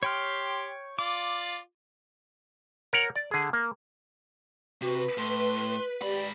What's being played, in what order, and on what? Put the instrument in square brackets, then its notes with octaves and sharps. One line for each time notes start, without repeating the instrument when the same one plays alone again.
[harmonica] G4 C6 [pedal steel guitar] C#5 G5 F6
[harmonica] F4 D5 [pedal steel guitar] D6
[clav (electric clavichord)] A#4 C#5 F#5
D5
D3 G#4
A#3
[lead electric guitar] C3 [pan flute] F#4 [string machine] B4
[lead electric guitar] A2 [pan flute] C6
[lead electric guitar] G#2 B5 [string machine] G4 [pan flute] D5